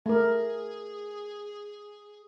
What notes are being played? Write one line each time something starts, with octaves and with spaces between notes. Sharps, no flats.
A3 G#4 A#4